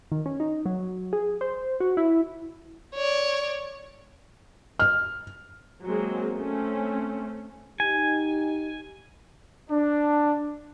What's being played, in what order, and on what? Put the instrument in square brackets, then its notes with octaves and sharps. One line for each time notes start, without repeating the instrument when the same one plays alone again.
[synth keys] D#3
C#4
D#4
F#3
G#4
C5
F#4
E4
[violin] C#5 D5
[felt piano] F6
[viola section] F#3 G#3 A#3 C4 G#4
A3 C4 C#4
[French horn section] D#4 G4 [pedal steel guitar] G#5
[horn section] D4